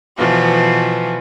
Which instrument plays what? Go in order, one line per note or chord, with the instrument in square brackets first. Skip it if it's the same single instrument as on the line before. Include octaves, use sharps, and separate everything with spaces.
[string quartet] B2 E3 F3 A3 B3